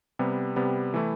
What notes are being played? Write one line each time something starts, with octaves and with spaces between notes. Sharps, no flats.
C3 G3 B3
C3 G3 B3
E3 A3 E4